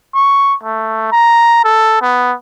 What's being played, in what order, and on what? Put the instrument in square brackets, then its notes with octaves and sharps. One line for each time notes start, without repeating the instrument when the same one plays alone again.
[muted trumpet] C#6
A3
A#5
A4
B3